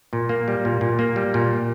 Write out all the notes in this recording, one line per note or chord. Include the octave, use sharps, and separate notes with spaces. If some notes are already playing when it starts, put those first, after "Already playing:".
A#2
A#3
G3
A#2
A#2
A#3
G3
A#2